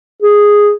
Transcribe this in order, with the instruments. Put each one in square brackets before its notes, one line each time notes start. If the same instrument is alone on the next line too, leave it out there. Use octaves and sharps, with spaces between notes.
[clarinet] G#4